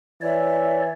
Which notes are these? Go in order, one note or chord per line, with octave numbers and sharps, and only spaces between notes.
E3 C#5 D5 E5